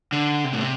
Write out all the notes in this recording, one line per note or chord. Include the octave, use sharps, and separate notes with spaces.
D3
C3
A2
C3